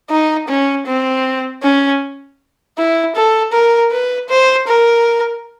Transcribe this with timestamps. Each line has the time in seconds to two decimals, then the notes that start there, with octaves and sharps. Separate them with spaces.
0.10 D#4
0.48 C#4
0.87 C4
1.63 C#4
2.77 E4
3.16 A4
3.53 A#4
3.92 B4
4.30 C5
4.68 A#4